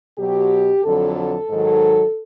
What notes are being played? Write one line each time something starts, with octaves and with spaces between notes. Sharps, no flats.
B2 F#3 G4
F2 D3 F#3 A4
G#2 D#3 F#3